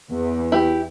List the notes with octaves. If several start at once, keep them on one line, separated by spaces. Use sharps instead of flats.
E2
E4 G4